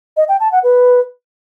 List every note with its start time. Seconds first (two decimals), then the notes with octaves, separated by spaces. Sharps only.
0.17 D#5
0.29 G5
0.40 A5
0.52 F#5
0.64 B4